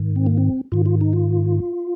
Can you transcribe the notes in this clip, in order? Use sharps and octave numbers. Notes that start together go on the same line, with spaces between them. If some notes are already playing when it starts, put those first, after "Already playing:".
Already playing: G#2 D#3
C4
A#3
C4
G#2 D#3 F4
F4
D#4
F4